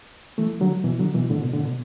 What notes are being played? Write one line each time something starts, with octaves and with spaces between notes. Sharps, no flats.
E3 A3
D3 F#3
B2 E3
D3 F#3
B2 E3
A2 D3
B2
A2 D3
B2